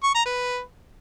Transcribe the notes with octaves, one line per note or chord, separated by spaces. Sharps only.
C#6
A#5
B4